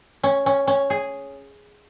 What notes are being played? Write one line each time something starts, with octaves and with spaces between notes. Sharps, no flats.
C#4
C#4
C#4
G#4